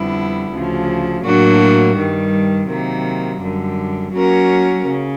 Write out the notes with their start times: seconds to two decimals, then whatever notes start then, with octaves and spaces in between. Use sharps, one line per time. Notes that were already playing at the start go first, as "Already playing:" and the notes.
Already playing: F2 D3 G3 B3 E4
0.52 D2 C#3 F3
1.24 A2 F#3 A#3 D4 F#4
1.97 G2 D#3 G3
2.69 C3 D#3 F#3 A#3
3.41 F#2 D3 G3
4.14 F#3 A#3 C#4 F#4 A#4
4.86 C#3